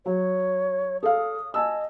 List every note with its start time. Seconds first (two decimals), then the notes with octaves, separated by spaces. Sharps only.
0.06 F#3 C#5
1.03 A4 F5 D#6
1.54 D#5 G#5 A5 E6